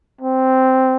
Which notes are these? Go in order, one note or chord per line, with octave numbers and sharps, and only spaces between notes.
C4